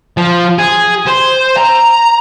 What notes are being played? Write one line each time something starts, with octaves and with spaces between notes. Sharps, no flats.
F3
G#4
C5
A#5